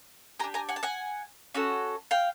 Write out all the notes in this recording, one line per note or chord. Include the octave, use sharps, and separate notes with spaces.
D4 G4 G#5 A#5
G#5 A#5
F#5 G#5
A5
F#5 G#5
C#4 F#4 A4
F5 G5